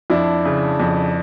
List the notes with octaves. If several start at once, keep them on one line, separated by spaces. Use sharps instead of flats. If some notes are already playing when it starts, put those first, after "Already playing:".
F2 D4 E4
C#3
F2